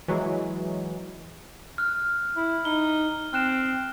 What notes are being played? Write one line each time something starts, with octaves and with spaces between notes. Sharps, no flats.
E3 F#3 G#3
F6 F#6
E4
D#4 G7
C4 F6 F#6 E7